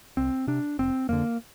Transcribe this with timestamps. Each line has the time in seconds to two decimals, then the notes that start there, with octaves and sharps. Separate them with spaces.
0.17 C2 C4
0.47 C3 D4
0.79 F1 C4
1.09 F2 D3 A#3